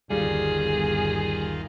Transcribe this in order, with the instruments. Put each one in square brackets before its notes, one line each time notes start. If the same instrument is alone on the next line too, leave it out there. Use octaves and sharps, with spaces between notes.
[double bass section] G1 [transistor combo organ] D#2 D#3 F4 [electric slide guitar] G3 [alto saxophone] G#4